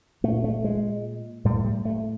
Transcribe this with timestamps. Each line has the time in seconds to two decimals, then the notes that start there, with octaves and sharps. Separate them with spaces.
0.24 A#2 A3
0.44 A3
0.64 G#3
1.45 A2 G3
1.65 G3
1.85 A3